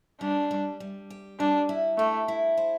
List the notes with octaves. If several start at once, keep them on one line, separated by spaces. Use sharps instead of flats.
G3 D4
G3
G3
G4
G3 D4
E4
A3 G4
E4
C5